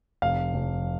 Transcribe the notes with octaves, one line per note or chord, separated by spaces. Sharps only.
F1 F5
F1